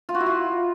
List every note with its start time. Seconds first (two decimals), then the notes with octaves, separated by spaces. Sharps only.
0.09 F4
0.15 F#4
0.20 E4
0.26 F4